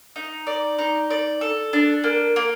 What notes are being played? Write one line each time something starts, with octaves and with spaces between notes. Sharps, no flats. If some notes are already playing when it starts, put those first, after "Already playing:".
D#4
D5
D#4
D5
A4
D4
A#3
A#3